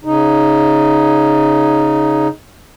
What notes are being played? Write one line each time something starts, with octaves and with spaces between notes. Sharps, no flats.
C#3 D#4